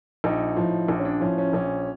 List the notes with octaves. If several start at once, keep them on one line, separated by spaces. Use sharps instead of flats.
A#1 D#4
A2 F3
A#1 D4
C#4
D4
A2 F3 C#4
C#4
A#1 C#4